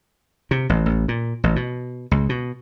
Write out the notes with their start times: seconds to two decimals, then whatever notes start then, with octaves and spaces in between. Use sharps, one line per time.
0.51 C3
0.69 A1
0.86 A1
1.08 A#2
1.44 A1
1.56 B2
2.11 C#2
2.29 B2